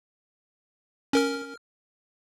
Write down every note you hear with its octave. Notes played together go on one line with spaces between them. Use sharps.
C#4 A#4 F6